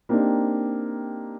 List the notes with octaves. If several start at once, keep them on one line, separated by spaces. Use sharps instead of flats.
A#3 C4 D4 D#4 G4